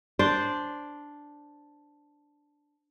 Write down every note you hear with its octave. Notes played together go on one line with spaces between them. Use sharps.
D4 C5 D5